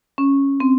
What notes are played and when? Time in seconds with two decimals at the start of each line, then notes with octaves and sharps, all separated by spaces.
0.18 C#4
0.60 C4